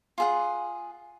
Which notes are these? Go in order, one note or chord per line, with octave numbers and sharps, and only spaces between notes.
F4 G#4 F#5